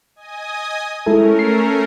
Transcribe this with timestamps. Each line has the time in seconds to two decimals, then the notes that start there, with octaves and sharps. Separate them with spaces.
0.16 D#5 G#5 D#6
1.06 G#3 A3 C#4 E4 A4 A#4
1.39 C7